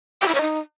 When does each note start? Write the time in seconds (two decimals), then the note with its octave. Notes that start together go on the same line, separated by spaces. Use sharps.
0.22 G4
0.28 E4
0.35 C#5
0.41 D#4